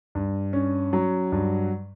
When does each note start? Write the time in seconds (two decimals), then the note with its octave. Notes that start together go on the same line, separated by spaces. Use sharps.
0.15 G2
0.53 C#4
0.93 F#3
1.32 G2